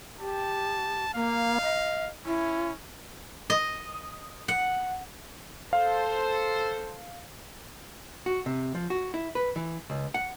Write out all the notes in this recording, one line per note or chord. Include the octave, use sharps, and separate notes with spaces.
G4 A5
A#3 F5
D#5
C#4 E4
D#5
F#5
A4 C5 F5
F#4
C3
F3
F#4
E4
B4
E3
C#2
F#5